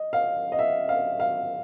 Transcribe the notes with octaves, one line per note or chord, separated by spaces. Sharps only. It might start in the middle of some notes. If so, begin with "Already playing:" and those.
Already playing: D#5
F5
D#5
E5
F5
F5